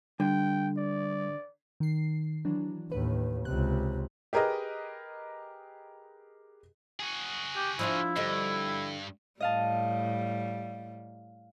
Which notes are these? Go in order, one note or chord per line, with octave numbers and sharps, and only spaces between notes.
D3 G3 G5
D5
D#3 C7
E3 F#3 D4
D#2 A2 B4
C#2 C3 F#6
G4 G#4 A#4 B4 D#5
F#4 G#4
G4
F3 D4 E4 F4
G2 D3 G3 D#4
A2 G3 D#5 F5 A5